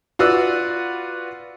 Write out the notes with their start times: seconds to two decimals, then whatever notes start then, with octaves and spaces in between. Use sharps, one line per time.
0.19 F4 F#4 B4 D5 E6